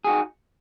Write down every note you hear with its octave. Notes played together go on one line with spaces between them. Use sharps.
D#4 F#4 G#4